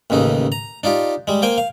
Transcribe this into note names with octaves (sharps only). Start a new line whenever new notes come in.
A1 D#2 C#3 D#4
A#5
D4 D#4 F4 G4
G3 G#3
A#3 C5 G5 G#5
F5